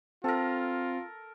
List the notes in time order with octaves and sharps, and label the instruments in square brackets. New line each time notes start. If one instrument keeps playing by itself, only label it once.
[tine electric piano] C4 [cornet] F4 [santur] A4 A#4